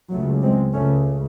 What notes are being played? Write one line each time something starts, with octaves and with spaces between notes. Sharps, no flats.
C#2 C#3 F#3 A3
G#3 C4
C#2 C#3 A3 C#4